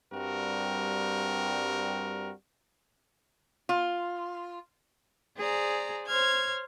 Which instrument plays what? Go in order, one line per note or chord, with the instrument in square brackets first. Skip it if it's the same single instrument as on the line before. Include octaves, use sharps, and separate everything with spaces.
[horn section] G2 G3 C4 F#4 A#4
[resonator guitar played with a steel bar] F4
[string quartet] G#4 C5 D5 A#5
C5 C#5 F6 G#6